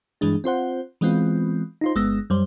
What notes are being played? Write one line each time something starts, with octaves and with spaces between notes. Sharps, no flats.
G2 E3 G#3 D4
C4 F4 C5 F#5
E3 G#3 B3 C4 F4
D#4 F4 C5
G1 G#3 B3 E6 A#6
F#2 G3 C5